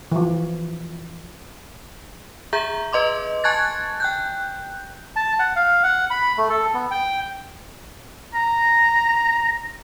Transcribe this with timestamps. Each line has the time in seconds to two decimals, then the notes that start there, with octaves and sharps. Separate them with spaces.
0.11 E3 F3
2.53 G#4 E5 A#5 G6
2.93 B4 D#5 C6 D6
3.44 G#5 A5 C#6 F#6 G#6 A6
4.00 G5 F#6 G6
5.16 A5
5.39 F#5
5.56 F5
5.83 F#5
6.10 B5
6.38 A3
6.50 A4
6.74 B3
6.91 G5
8.34 A#5